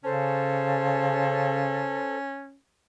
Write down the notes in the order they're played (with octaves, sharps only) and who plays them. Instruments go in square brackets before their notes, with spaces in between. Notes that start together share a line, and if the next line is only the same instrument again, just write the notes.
[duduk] C#3 [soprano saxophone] C#4 [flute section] A4 C5 A5